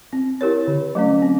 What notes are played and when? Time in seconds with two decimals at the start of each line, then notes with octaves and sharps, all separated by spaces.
0.13 C4
0.41 E4 G4 A#4 C#5
0.67 D3
0.95 F#3 A3 C#4
1.22 C4